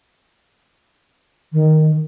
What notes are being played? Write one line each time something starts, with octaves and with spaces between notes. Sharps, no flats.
D#3